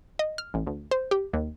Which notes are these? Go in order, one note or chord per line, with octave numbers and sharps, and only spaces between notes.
D#5
F6
A1
D2
C5
G4
D#2